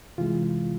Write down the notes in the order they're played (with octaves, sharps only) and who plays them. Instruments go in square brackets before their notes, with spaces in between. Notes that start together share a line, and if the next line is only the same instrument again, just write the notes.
[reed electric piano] C3 E3 G#3 F4